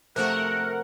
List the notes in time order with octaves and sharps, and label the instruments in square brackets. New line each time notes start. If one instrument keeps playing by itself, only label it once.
[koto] C3 F3 F#4 [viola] A3 [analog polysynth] A#4 F#5 [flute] F#6